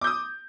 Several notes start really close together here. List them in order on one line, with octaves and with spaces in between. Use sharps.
D6 G6 D#6